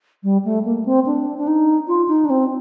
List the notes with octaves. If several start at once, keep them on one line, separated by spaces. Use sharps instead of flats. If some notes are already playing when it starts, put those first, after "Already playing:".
G3
A3
A#3
C4
D4
D4
D#4
F4
D#4
D4
C4